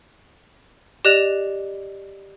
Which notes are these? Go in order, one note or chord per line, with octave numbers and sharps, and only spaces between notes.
G4 D5 D#5 F#6 F7